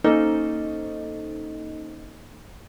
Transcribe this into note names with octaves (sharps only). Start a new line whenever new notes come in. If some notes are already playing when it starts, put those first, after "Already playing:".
A#3 C#4 D#4 A4 C5 D#5